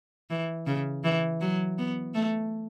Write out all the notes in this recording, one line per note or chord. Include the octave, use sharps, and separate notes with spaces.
E3
C#3
E3
F#3
B3
A3